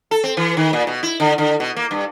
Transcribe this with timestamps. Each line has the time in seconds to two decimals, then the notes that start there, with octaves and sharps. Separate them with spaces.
0.11 A4
0.24 C4
0.37 E3
0.57 D#3
0.73 A#2
0.87 B2
1.03 E4
1.20 D3
1.38 D3
1.60 B2
1.77 A#3
1.91 G2